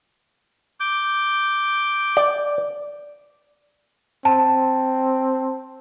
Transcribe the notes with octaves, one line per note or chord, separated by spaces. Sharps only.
D6 G6
D5
C4 A5